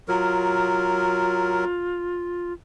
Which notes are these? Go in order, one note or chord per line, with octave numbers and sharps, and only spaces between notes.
F#3 F4 A#4